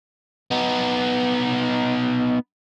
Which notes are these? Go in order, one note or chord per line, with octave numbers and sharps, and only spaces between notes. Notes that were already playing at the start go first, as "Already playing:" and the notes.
B3 D#4